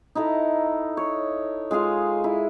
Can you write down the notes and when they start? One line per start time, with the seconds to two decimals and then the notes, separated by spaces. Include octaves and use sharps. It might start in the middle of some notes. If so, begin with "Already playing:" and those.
0.15 D#4 E4 A4 A#5
0.97 C#5
1.71 G#3 F4 G#4 F5
2.24 E4